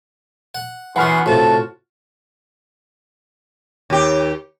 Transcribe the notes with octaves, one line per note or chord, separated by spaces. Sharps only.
F#5
F#2 E3 B3 F#4 F#5 B5 C6 F6
A2 C3 F4 F#4 A5
D#2 G4